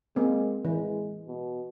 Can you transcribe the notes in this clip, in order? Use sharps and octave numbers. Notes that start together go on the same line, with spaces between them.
G#3 A#3 C4
E3 G#3
B2